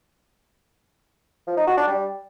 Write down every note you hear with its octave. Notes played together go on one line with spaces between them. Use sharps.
F3
D#4
F#4
D4
G3